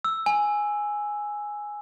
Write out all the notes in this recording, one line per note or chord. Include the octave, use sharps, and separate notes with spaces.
E6
G#5